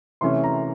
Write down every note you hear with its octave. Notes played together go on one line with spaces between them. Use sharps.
C3 E3 A3 C#4 C6
A#5